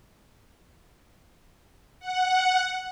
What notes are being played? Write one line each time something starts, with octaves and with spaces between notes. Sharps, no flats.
F#5